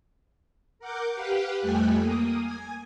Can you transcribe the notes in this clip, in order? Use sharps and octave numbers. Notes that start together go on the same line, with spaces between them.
A#4 F#5 D6 G6
G4 B4 F5 F#5
F2 G3 A3 G5 G#5 F#6
A#3 D#6
G#5